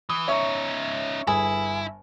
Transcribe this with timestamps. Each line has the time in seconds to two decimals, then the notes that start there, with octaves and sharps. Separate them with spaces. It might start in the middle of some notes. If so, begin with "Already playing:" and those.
0.10 E3 D#6
0.28 C#4 D#4 C#5 E5 C#6
1.27 G1 E4 G#4